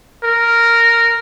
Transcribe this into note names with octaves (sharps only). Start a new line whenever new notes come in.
A#4